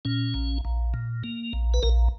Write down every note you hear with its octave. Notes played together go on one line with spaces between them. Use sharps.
A#2 C#4
A#1
A#1
A#2
A#3
A#1
B4
A#1 A#4